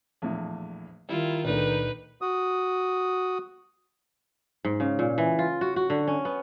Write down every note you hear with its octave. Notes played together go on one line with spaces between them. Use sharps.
A#1 E2 A2
D#3 G3 E4 F4
C#2 A#2 A3 D4 D#4 B4
F#4 D#6
G#2
C#3
A#2
E3
F4
F#4
F#4
D3
C#4
B3